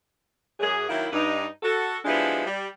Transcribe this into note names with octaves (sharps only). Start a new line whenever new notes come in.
F#2 G#4
D#3 F#3 A#3 E4
G2 D#4
F#4 A4
F3 G3 G#3 B3 D4 E4
G3